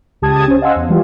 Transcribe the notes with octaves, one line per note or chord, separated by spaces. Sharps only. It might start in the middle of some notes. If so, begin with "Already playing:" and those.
C#2 G4 A5 D#6 G#6
C#4 C5
D#5 F5 F#5 G#5 C6 E6
E2
E3 F3 G3 G#3 F4 G4